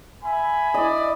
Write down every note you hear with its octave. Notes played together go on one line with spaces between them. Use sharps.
E5 G#5 B5
E4 D5 D#5